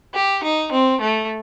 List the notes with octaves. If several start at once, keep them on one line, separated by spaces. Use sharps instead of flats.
G4
D#4
C4
A3